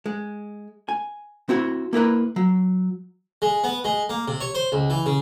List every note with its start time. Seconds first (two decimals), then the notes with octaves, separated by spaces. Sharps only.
0.06 G#3
0.89 G#5
1.49 C4 E4 F#4
1.93 A#3 E4 A#4 B4
2.36 F#3
3.42 G#3
3.64 B3
3.85 G#3
4.09 A#3
4.28 C3
4.41 C#5
4.55 C5
4.72 C#2
4.90 E3
5.06 C#3